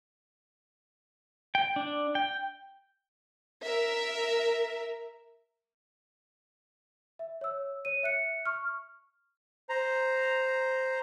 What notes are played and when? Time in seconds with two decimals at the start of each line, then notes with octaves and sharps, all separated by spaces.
1.55 G5
1.76 D4
2.15 G5
3.63 A#4 E5
7.19 E5
7.41 C#5 E6
7.85 C#5 D#7
8.03 E5 F#6 C#7
8.45 C#6 F6
9.69 C5 A#5